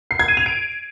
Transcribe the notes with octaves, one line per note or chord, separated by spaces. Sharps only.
C7
G#6
D#7
F7
D7